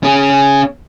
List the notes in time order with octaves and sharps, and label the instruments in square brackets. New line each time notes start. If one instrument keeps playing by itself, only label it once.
[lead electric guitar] C#4 G#4